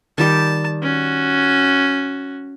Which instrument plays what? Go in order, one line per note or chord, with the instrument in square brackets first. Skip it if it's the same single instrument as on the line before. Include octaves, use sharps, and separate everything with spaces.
[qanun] D#3 G3 G4 [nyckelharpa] A5
[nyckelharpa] C#4 F#4